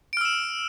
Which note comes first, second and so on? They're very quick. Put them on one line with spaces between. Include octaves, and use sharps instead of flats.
D7 F6 E6 E7